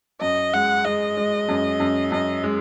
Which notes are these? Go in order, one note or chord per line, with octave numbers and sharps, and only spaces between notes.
F#2 D#5
G#3 F#5
G#3 D#5
G#3
F#2
F#2
F#2 D#5
G#3